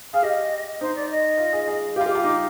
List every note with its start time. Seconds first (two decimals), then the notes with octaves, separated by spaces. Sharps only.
0.13 G#4 F5
0.23 G4 D#5
0.80 D#4 C5
0.95 D5
1.10 D#5
1.38 F4
1.53 G#4
1.68 G#4
1.96 G4 F5
2.01 F4
2.06 G4 D6
2.15 F4
2.24 D#4 D6